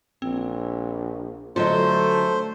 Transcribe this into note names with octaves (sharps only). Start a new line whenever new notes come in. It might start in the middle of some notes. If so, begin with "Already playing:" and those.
A#1 C4
D3 F#3 A3 F4 C5 D#5